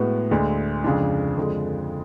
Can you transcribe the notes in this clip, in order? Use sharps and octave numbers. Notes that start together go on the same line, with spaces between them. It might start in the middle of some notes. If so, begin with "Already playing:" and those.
Already playing: A2 G#3 B3 F#4
D2 D3 G#3
F2 C#3 G#3 D4
F2 D3 G#3